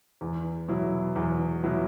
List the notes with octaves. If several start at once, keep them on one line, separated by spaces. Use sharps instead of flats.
E2
B2 F#3 E4
E2
B2 F#3 E4